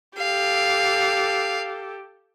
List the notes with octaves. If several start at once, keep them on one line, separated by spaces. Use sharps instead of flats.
G4 A4 F5